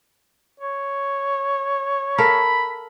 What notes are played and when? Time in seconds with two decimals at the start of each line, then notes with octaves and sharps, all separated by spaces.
0.60 C#5
2.18 A4 A#4 F5 B5